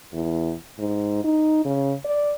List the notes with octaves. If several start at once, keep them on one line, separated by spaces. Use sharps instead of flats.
E2
G#2
D#4
C#3
D5